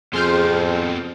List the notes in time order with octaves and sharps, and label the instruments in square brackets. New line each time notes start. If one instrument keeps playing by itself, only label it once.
[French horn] F2 [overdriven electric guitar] B2 C4 [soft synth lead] G#4 [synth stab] C6 F6 G6